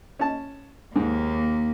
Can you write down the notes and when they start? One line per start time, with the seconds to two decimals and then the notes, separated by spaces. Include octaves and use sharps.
0.19 C#4 A5
0.96 D#2 G#2 A#3